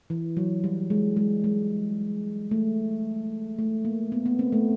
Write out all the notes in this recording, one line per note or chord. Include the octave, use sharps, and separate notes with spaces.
E3
F#3
G3
G#3
G#3
G#3
A3
A3
A#3
B3
B3
C4
A3